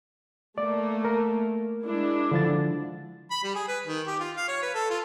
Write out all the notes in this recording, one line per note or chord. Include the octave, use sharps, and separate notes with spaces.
A3 A#3 D5
A#4
G#3 D4 E4
D3 F3 A6
B5
G3
G#4
B4
D#3
G4
F4
F5
C#5
B4
A4
F4